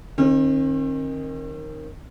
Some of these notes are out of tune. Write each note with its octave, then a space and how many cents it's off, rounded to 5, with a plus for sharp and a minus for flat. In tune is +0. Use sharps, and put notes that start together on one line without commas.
D#3 -5 C4 +45